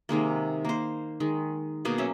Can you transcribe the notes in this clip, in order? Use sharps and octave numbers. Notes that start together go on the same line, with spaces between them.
C3 D#3 G#3 A#3
A#3 C5
D#3 G#3
B2 A#3 G#4 D6
F#3 C#4 E5